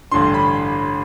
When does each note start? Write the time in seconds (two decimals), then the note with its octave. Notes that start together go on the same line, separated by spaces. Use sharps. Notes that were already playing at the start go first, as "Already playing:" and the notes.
0.12 A1 G2 D3 C6
0.34 B5